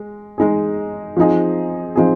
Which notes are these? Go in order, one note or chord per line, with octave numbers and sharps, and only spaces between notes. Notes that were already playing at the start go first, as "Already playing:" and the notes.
Already playing: G#3
G#3 D#4 G#4
F3 C4 D#4 G#4
F3 C4 D#4 G#4